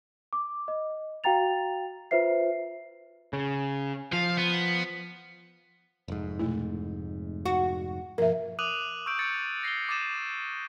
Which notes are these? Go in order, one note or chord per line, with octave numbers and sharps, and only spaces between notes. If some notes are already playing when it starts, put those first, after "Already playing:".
D6
D#5
F#4 F5 G5 A#5 A6 F7
F4 B4 C5 E5 C7
C#3
F3 F5
B3
F1 G#2
B2 A3 E4
F#4 F#5
G2 B2 F3 A#3 A#4 E5
D6 D#6 F#6 D#7 F7 F#7
C#6 E6 G6 D7
D#6 G6 A6 C#7
A#6 C7 D7 G7
D6 D#6 G6 A6 D#7 E7